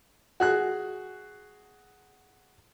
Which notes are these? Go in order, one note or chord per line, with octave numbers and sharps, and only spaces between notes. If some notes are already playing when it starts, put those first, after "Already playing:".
F#4 G#4 F#6